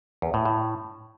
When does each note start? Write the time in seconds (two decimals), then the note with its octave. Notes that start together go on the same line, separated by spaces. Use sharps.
0.22 E2
0.34 A2
0.45 A2